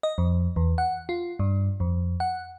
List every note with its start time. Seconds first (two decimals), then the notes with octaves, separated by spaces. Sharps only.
0.03 D#5
0.18 F2
0.56 E2
0.78 F#5
1.09 F4
1.39 G2
1.80 F2
2.20 F#5